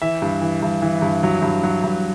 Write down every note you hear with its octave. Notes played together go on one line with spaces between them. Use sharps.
E3 E5
G2
E3
G2
E3
G2
F#3
G2
F#3
G2